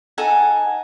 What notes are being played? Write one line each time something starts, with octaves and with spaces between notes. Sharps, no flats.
D#4 A4 F#5 G#5